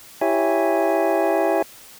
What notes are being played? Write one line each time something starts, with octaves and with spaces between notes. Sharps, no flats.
E4 G4 C#5 E5 G#5